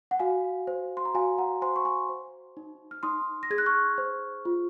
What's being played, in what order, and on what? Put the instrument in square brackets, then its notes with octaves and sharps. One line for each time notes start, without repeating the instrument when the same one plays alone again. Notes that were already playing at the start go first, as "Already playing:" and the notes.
[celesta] F#5
F#4 F5 G#5
C5
C6
A#5
F#4 F5 G#5
F#5 A#5
C5 G#5 C6
C#6
G#5 C6
C5
D#4
F6
D#4 C6 D#6
A#6
G#4 G#6
F#6
C#6 F6
C5
F4